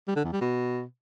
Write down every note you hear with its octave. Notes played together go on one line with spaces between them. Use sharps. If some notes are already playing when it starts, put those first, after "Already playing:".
G3
D3
E2
G3
B2